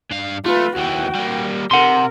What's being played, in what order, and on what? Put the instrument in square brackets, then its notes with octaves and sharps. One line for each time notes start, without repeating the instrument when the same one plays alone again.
[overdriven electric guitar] G2 F5
[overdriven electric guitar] A3 [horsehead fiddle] F4 B4
[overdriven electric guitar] D#2 E3 [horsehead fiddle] F#4 G5
[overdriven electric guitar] G3 A#3
[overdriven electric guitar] C3 [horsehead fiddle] A#4 [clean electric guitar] F#5 C6